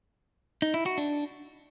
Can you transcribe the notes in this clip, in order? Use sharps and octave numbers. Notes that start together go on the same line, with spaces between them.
D#4
E4
F#4
D4